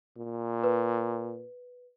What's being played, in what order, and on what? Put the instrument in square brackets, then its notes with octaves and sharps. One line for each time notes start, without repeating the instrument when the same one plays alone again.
[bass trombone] A#2
[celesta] B4